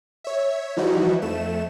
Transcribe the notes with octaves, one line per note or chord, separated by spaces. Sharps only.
C#5 E5
E3 F3 G3 D#4 E4 F#4
F2 A3 E7